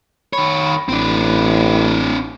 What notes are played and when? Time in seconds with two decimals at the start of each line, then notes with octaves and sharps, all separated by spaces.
0.33 D#3 C#5 B5
0.89 A1 C4 D4